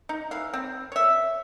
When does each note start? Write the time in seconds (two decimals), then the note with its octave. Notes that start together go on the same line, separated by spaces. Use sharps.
0.09 D#4
0.31 E3 F5
0.53 C4
0.92 C#5 E5